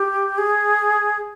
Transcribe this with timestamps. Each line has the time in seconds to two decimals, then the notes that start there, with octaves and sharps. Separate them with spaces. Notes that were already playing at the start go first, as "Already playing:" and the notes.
Already playing: G4
0.38 G#4